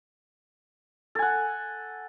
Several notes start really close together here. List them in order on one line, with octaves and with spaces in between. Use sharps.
A4 G#5 F#5